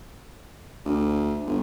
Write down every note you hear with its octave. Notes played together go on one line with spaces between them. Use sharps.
D2
G1